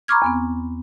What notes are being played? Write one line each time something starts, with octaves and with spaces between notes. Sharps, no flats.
A#5 B5 C#6 D6 F6 G#6
E2 B3 C4